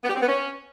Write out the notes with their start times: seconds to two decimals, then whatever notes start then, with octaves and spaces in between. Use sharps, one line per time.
0.03 B3
0.09 G4
0.15 C4
0.21 B3
0.27 C#4